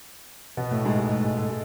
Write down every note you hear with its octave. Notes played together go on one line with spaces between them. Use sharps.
B2 B3
A2 A3
G#2 G#3
G#3
A3
G#3
A3
G#3